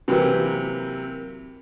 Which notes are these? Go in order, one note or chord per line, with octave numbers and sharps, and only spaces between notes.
C3 E3 F#3 A#3 G4